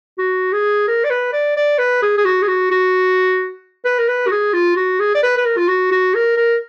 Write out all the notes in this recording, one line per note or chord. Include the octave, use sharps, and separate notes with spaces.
F#4
G#4
A#4
D5
B4
D5
D5
B4
G#4
G#4
F#4
G#4
F#4
F#4
B4
A#4
B4
F#4
G#4
F4
F#4
G#4
D5
B4
B4
A#4
F4
F#4
F#4
A#4
A#4